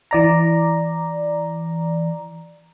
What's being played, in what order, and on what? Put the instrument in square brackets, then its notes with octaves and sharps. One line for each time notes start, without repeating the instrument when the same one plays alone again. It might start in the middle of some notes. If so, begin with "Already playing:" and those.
[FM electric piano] E3 D5 A#5